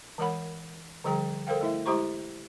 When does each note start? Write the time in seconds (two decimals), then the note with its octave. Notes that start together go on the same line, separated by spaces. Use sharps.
0.18 E3 G#3 A#4 C#5 F#5 B5
1.04 D3 F3 G3 G#4 G5 A#5
1.47 A4 A#4 C5 F5 G5
1.61 A3 E4 E5
1.86 G#3 E4 G4 C5 A#5 C#6